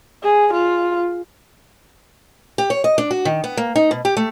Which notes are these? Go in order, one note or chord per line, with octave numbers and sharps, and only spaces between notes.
G#4
F4
G4
C#5
D#5
D4
F#4
D#3
B3
A#3
D#4
B2
G4
A3